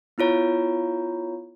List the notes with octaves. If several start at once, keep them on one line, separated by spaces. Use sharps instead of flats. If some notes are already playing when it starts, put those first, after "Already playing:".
B3 E4 F4 C#5 A#5